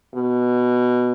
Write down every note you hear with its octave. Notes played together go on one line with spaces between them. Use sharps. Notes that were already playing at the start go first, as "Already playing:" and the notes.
B2